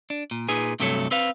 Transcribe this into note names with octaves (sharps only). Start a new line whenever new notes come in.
D4
A#2
A#2 D#4 G#4 B4 G#5
G2 C3 F#3 A3 A4 C#5
C4 B4 F5